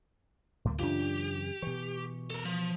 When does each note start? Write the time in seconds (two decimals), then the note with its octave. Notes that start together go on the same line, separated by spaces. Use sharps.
0.65 D2 A2 G3 A#3
0.79 F#2 C#3 E3 D4 F4 G4
1.62 B2 E3 C#6
2.30 A4 A#4
2.45 F3